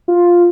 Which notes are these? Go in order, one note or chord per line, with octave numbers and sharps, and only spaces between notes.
F4